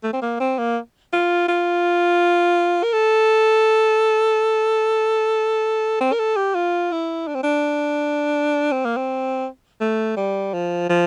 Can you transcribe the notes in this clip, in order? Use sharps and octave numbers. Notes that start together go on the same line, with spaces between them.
A3
C4
A#3
C4
A#3
F4
F4
A#4
A4
C4
A#4
A4
G4
F4
E4
D4
C4
D4
C4
A#3
C4
A3
G3
F3
F3